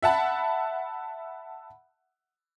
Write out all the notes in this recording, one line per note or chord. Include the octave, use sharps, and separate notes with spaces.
E5 F#5 A5 B5